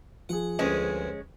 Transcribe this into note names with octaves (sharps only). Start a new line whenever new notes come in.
F3 G#4 F#5
D2 G2 G#3 C4 C#4